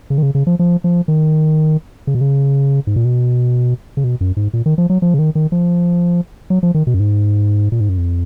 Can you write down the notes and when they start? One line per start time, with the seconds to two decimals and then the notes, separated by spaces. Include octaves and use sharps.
0.10 C#3
0.18 D#3
0.23 C#3
0.35 C#3
0.47 F3
0.59 F3
0.84 F3
1.08 D#3
2.07 C#3
2.15 B2
2.21 C#3
2.87 G#2
2.96 A#2
3.05 B2
3.97 C#3
4.04 B2
4.21 F#2
4.37 G#2
4.53 A#2
4.66 D#3
4.78 F3
4.90 F#3
5.02 F3
5.14 C#3
5.19 D#3
5.35 D#3
5.52 F3
6.50 F#3
6.63 F3
6.74 D#3
6.87 B2
6.94 F#2
7.00 G#2
7.72 A#2
7.80 G#2
7.89 F#2
7.98 F2